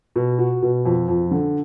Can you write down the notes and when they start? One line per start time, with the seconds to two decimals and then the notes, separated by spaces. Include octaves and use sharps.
0.16 B2
0.38 F#4
0.62 B2
0.85 F2
1.08 F2
1.31 D3